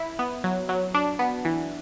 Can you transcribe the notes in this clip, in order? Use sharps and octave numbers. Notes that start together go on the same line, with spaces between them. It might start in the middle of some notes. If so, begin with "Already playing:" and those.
Already playing: E4
B3
F#3
F#3
D4
B3
E3